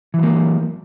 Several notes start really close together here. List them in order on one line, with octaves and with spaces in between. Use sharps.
E3 F#3 A#3